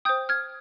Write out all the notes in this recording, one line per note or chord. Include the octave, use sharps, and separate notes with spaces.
C5 G5 D#6 G6
F6 G#6